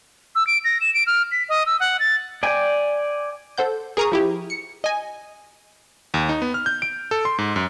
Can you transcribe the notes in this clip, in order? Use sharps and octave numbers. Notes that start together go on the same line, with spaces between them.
E6
D7
A#6
E7
D7
F6
B6
D#5
E6
F#5
A6
D5 G5 G#5
A4 C5 F#5 G6
G#4 A#4 A#5 C#6 D#6
F3 E4 G4
C#7
D#5 G#5
D#2
D#4
B3
F6
G6
D7
A4
C6
G#2
F#2